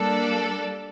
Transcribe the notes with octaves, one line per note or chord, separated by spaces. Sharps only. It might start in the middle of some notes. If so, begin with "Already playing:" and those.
Already playing: G3 A#3 D4 A4 D5